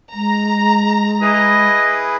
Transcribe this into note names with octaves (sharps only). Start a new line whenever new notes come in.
G#3 A#5
E4 G#4 B4 D#5